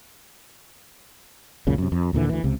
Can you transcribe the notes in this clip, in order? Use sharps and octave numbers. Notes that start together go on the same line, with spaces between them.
C#2 F#2 A#2 C#3
F#2 C3
F2
D#2 A#2 D3 E3
D2 E3
C#2 C3